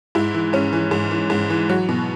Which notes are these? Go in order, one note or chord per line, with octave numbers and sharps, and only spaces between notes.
G#2 E4
E3
G#2 C#4
E3
G#2
E3
G#2
E3
F#3
B2